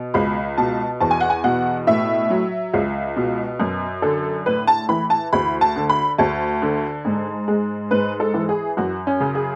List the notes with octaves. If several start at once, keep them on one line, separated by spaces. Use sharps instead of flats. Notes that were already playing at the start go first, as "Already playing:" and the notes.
Already playing: B2
C#2 B5
B2 A5
E2 A5
G#5
F#5
G#5
B2 F#5
A2 E5
F#3
C#2
B2
F#2
D3 A4
A2 B4
A5
E3 B5
A5
D2 B5
A5
D3
B5
D2 A5
D3
G#2
G#3
G#2 B4
A4
E3
G#4
F#2 F#4
C#4
C#3
G#4